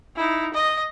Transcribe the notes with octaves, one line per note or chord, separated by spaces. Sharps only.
D#4 E4
D#5